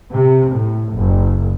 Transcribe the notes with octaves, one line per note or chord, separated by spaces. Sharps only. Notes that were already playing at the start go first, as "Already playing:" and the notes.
C3
A2
F#1